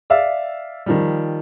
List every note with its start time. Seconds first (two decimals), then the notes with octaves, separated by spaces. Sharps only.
0.10 D5 E5 F5 E6
0.86 D#3 F3 G3